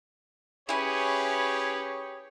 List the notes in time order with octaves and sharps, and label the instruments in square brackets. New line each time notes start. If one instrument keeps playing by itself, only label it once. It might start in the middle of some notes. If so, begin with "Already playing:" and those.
[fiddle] C#4 B4 [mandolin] E4 G#5 [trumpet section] G4 G#4 C#5